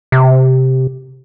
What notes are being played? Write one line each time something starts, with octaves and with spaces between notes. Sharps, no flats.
C3